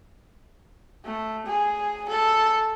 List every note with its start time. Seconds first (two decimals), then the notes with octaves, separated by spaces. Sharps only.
1.05 A3
1.46 G#4
2.08 A4